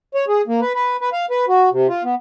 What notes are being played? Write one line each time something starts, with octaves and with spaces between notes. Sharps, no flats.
C#5
G#4
A#3
B4
B4
B4
F5
B4
F#4
C3
F4
B3